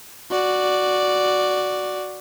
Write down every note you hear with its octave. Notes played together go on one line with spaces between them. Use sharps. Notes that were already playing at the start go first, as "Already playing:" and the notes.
F#4 D5